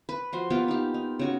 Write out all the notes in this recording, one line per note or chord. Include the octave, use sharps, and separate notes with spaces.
B4
F3 F#4 C6
A#3 B3 F4 G4
D#4 G4
D#4
C#3 F#4 C#6